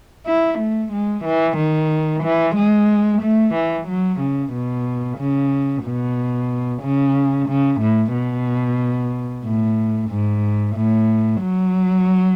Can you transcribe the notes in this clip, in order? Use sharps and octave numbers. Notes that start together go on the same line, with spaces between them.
E4
A3
G#3
E3
D#3
E3
G#3
A3
E3
F#3
C#3
B2
C#3
B2
C#3
C#3
A2
B2
A2
G#2
A2
F#3